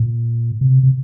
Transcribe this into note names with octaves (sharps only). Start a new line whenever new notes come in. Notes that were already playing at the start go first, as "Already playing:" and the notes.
Already playing: A#2
C3
C3